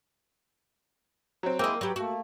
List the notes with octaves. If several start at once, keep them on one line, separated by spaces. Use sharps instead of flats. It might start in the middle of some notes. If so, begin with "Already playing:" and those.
F#3 C4
A#3 E4 G#4 C5 D#5 G5 E6
F#3 G4 B4
A3 A#3 F#4